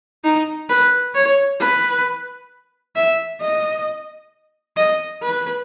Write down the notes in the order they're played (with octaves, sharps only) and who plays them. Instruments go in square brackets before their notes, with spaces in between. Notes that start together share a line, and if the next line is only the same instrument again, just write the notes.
[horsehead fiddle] D#4
B4
C#5
B4
E5
D#5
D#5
B4